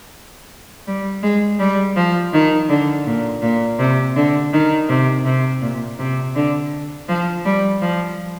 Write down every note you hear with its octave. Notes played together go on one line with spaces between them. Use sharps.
G3
G#3
G3
F3
D#3
D3
A#2
A#2
C3
D3
D#3
C3
C3
A#2
C3
D3
F3
G3
F3